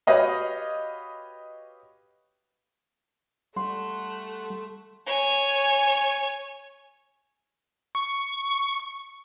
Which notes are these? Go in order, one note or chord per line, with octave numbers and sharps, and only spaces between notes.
F#4 G4 B4 C#5 D#5 F5
G3 A3 F#5 C6
C#5 G#5
C#6